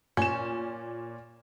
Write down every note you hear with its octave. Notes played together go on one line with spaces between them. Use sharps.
A#2 C#4 E7